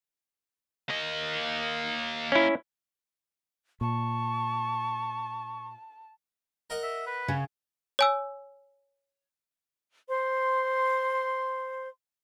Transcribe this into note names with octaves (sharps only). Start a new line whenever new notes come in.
A#3 D#5
C#4 E4
A#2 A5 C#6
A#4 D#5 F#5
E5
B4
C#3 C#4
C#5 G#5 E6
C5 C6